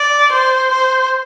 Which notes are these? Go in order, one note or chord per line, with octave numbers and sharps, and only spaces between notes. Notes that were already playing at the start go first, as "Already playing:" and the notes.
Already playing: D5
C5
C5